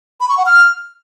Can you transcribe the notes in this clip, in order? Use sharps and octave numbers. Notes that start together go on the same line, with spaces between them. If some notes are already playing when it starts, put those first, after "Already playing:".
B5
C#6
F#5
F6